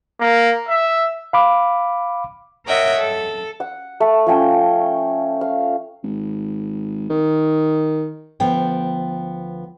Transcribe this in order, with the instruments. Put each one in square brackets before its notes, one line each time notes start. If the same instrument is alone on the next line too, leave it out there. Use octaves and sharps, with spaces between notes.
[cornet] A#3
E5
[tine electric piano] F5 B5 D6
[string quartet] A#4 C#5 D#5 E5 F#5 G5
A4
[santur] F#5
A3
F3 C#4 G5
F5
[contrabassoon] G#1
D#3
[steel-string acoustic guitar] D2 F3 B3 G5